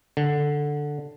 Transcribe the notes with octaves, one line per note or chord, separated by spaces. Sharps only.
D3